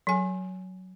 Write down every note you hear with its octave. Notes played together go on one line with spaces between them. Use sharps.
F#3 G#5